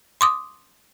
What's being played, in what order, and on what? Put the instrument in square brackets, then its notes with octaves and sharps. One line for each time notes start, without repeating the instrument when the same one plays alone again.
[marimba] C6 D6 D#6